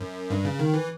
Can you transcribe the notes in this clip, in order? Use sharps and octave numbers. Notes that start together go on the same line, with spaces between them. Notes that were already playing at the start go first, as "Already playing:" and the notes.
Already playing: F#2
G2
C#3
D#3
E3